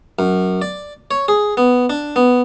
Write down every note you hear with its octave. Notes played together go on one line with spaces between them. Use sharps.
F#2
D5
C#5
G#4
B3
D4
B3